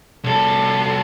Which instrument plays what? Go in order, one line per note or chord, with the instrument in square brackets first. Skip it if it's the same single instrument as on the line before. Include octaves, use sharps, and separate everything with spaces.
[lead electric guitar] C2 A4